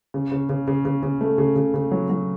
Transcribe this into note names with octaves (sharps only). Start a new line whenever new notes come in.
C#3
C#3
C#3
C#3
C#3
C#3
A3
C#3
C#3
C#3
F#3
F#3